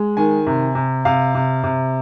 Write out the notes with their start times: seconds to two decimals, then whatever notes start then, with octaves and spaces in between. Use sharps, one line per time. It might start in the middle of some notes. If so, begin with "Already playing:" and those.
Already playing: G#3
0.17 D#3 G#5
0.47 C3
0.75 C3
1.05 C3 F5
1.35 C3
1.64 C3